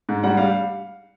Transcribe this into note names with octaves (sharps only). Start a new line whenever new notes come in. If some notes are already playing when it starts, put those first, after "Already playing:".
G#2
G3 F#5
G3 F5